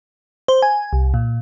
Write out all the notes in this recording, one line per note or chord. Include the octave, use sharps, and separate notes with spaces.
C5
G#5
C2
A#2